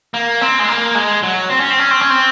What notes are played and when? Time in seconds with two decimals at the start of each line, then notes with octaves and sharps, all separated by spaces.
0.14 A#3
0.41 C4
0.59 G#3
0.68 A#3
0.95 G#3
1.23 F#3
1.50 C4
1.60 C#4
1.70 C4
1.79 C#4
1.91 C4
2.01 C#4
2.10 C4